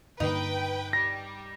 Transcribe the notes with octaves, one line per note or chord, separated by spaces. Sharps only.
G2 D3 A#3 D#4 B4 G5
G3 A#6